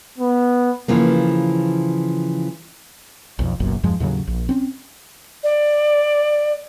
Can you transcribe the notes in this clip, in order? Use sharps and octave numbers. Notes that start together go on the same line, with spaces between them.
B3
C#3 E3 F3 A#3
B1 F2
F#1 B1 F#2 A#2
E2 G2 F3 G#3
D#2 A2 C#3 F#3
A#1
C4 C#4
D5